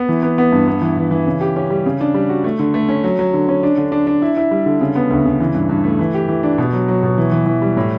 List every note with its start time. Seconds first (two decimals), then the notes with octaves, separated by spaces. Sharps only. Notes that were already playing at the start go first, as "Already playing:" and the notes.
Already playing: B3
0.09 E3
0.23 B3
0.38 B3
0.52 G2
0.68 B3
0.82 E3
0.97 E3
1.11 E3
1.27 C#3
1.41 G4
1.56 C#4
1.70 G3
1.86 C#3
2.01 D4
2.14 G3
2.29 F#4
2.44 A3
2.59 D3
2.74 A3
2.89 C#4
3.04 F#3
3.19 F#3
3.34 D3
3.48 C#4
3.63 D4
3.78 D3
3.92 D4
4.07 D4
4.22 E4
4.37 E4
4.51 G3
4.66 D3
4.81 C#3
4.96 B3
5.10 D2
5.25 C#3
5.40 E3
5.55 G2
5.69 G2
5.84 A3
5.99 E3
6.14 G4
6.29 E3
6.43 D4
6.58 B2
6.73 F#3
6.88 F#3
7.03 B2
7.18 E3
7.32 E3
7.46 E3
7.62 G3
7.77 A2